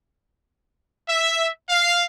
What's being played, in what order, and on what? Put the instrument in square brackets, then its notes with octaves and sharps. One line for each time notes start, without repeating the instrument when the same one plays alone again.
[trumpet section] E5
F5